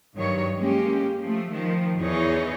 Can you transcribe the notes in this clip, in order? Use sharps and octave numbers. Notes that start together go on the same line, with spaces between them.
G2 D#3 F#3 C#5
G#3 A#3 C#4 G4
F3 A3
D#3 F3
E2 E3 D#4 G#4 C#5